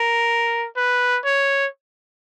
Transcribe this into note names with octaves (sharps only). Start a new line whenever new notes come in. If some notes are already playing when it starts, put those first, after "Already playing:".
Already playing: A#4
B4
C#5